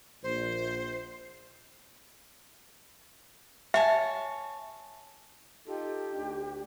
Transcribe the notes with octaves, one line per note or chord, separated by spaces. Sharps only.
A#1 C5
C#5 E5 G#5 A5
D#4 F4 G4 A4
D2 D4